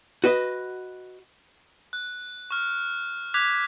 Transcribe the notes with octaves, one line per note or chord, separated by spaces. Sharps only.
F#4 B4 D#5
F#6
C#6 F6
D6 F#6 G#6 B6